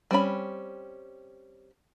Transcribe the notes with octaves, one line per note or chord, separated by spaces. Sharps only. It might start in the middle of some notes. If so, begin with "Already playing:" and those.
G3 C4 C#4 B5